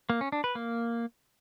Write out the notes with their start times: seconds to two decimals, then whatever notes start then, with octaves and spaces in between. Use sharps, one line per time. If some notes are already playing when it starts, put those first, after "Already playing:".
0.10 A#3
0.21 C#4
0.32 D4
0.44 B4
0.55 A#3